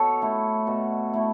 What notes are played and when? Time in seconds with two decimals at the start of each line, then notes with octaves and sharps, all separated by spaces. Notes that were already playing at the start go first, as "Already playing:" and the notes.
Already playing: B2 A4 C#5
0.22 A3 E4
0.67 B2
1.14 A3 E4